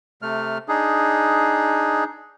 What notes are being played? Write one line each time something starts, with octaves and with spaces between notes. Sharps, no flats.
C3 A3 F6
D4 D#4 G#4